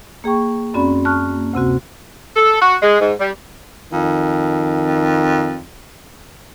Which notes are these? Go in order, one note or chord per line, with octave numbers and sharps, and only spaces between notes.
A#3 G#4 G5 C#6
F#2 C4 C#4 F#4 D5 B5
A5 C#6 F6 F#6
A#3
D2 C3 C4 F#4
A4
F#4
G#3
G#2
G3
F2 D#3